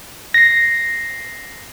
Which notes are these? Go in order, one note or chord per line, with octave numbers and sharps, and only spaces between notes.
A#6 C7